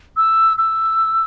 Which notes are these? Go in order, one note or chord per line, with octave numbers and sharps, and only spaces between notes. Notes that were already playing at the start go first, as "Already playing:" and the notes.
E6
E6